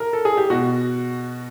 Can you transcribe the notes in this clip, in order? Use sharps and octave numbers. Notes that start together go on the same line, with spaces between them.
A#4
A4
G#4
G4
B2 F#4